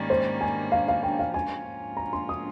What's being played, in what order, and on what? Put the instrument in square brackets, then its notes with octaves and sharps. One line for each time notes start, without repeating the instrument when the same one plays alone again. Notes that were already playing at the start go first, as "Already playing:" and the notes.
Already playing: [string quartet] G#2 D#3 G3 A#3 C#4
[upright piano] C5
G#5
F5
F5
G5
F5
[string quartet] G#2 F3 A#3 C#4 F4 [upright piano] G#5
[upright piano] A#5
C6
D#6